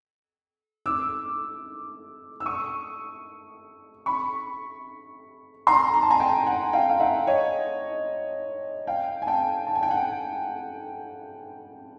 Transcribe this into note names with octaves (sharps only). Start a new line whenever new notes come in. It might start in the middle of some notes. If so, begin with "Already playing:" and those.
D6 E6
E6
C#6 D#6
B5 C#6
A#5 C6
A#5
A5
G#5 A#5
G5 A5
F#5 G#5
F5 G5
F5
E5 F#5
C#5 D#5
F5 G5
G#5
G5 A5
A5
G#5
G5
F#5 G#5